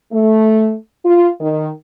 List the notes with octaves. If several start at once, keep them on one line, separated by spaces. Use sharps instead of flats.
A3
F4
D#3